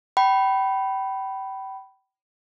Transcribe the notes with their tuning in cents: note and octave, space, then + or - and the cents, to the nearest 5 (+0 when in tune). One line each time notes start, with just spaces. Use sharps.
G5 -30 B5 +0